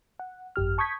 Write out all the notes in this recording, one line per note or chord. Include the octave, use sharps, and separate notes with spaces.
F#5
G#1 F#2 G4 F6
A5 C#6 D#6 G6 G#6 B6